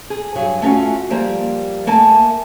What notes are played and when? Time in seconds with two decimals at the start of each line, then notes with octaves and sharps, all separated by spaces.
0.10 G#4
0.35 G2 F#3 G#4 G#5
0.62 A3 C#4 F4 F#4
1.10 F3 G3 A#3
1.87 A3 A#3 G#5 A5